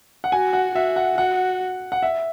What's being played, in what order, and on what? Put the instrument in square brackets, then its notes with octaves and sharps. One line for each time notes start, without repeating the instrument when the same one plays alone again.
[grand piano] F#5
[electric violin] F#4 [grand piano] G#5
[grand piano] F#5
[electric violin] F#4 [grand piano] E5
[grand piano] F#5
[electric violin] F#4 [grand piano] F#5
[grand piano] F#5
E5